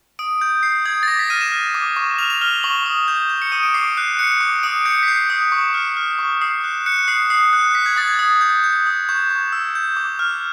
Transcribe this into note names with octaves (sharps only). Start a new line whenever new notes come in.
D#6 D7
G6
G6 C7
D#6 G#6
A6
D6 A#6
B6
F6 D#7
E7
F6
D6
C#6
F6 F7
F7
F6 G7
C#6 F#7
D#6
G6
G6
C#7
D#6 D#7
D7
D6 C7
F#6 C7
F#6 C#7
D6
D#6 D7
G6 C#7
B6
G6 C7
D#6
C#6
F6
F6
C#6
D#6 C7
F#6
F#6 C#7
D#6 C7
D#6 C7
F#6
F#6 B6
G#6
D#6 A6
G#6
D#6
G6
G6
D#6
C#6 G6
C#6
E6
G6
D6
F6